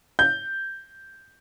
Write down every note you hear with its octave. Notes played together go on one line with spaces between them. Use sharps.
G6